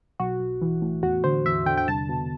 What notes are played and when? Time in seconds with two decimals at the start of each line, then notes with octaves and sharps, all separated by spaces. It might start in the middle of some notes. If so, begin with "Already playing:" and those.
0.20 B1 F#4
0.40 B1
0.62 E3
0.82 A2
1.03 E2 F#4
1.24 D3 C5
1.45 E2 E5
1.66 D3 G5
1.78 G5
1.87 C2 A5
2.09 B2